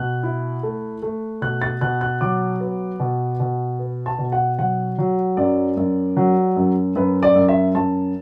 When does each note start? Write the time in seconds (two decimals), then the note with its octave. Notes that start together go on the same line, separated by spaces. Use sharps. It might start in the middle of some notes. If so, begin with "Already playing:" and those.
Already playing: B2 F#6
0.23 E4
0.63 A3
1.02 A3
1.41 B2 F#6
1.62 A6
1.81 B2 F#6
2.01 F#6
2.21 F#3 D6
2.61 B3
3.00 B2
3.40 B2
3.79 B3
4.06 A5
4.19 B2
4.32 F#5
4.59 F#3 F#5
4.98 F#3
5.37 F#2 D5
5.77 F#2
6.17 F#3
6.57 F#2
6.96 F#2 B4
7.23 D5
7.35 F#2
7.48 E5
7.75 F#2 A5